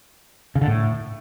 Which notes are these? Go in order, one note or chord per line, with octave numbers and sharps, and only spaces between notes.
C#3
D3
A2